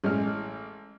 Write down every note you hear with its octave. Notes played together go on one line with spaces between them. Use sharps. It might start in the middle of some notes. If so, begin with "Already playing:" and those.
A1 A2 G#3 C#4 F6